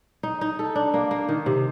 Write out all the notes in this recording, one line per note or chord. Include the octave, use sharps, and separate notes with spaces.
D#4
D#4
A4
D4
A#3
A#3
D#3
C3